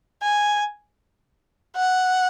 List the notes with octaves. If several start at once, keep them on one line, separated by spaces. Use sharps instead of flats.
G#5
F#5